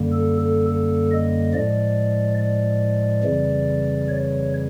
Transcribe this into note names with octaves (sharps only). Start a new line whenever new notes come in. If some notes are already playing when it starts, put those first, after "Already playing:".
Already playing: F#2 D3 G3 A#3
A4
A4
A4
D#5
A2 F3 G#3 D5
D5
F2 C#3 E3 G3
C#5